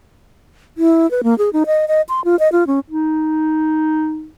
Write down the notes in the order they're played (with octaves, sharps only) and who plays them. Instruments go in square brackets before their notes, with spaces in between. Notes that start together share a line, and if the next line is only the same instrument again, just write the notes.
[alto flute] E4
B4
A#3
G#4
D#4
D#5
D#5
C6
F4
D#5
F4
C#4
[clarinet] D#4